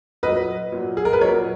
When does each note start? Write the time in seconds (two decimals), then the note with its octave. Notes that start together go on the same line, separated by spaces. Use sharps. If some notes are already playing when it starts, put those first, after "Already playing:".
0.23 A#2 F#3 B4 D#5
0.72 A#2 F#3
0.97 G#4
1.05 A#4
1.13 B4
1.21 A#2 F#3 A#4 C#5